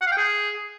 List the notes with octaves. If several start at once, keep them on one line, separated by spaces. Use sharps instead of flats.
F#5
F5
G5
G#4